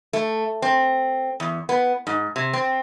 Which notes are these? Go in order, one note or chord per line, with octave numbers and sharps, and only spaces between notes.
A3
C4
E2
B3
G#2
C3
C4